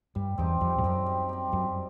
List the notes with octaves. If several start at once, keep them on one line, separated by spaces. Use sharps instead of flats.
G2 G3
E2 C4 D#4 G4
F2 G3
G2
F#2 C4 D#4 G4
G3
C4 D#4 G4
F#2 G3